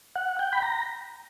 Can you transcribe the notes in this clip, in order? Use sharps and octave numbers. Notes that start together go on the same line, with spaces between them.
F#5
G5
B5
A#5